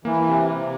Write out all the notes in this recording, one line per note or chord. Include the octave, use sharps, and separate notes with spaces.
E3 A#3
C3
C3